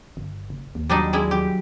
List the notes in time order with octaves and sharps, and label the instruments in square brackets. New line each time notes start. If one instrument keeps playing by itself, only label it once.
[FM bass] G1
F#1
D#2
[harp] F#3 [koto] G3 D4 D#4
[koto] G3 G#3 E4
G4